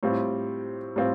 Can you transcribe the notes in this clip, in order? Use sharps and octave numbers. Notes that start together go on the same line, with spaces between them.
A2 G3 C4 F4
A2 G3 C4 F4